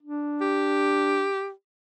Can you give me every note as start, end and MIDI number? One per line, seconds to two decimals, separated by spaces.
0.02 1.28 62
0.41 1.51 67